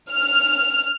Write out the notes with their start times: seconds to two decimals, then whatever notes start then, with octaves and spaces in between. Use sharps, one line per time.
0.11 F6